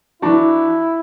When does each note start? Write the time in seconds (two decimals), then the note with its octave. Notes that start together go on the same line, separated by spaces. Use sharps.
0.22 E3 D4 E4 F#4